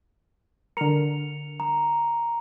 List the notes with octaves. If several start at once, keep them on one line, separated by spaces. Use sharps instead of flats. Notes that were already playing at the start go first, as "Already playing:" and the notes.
D3 A#4 C#7 F7
A#5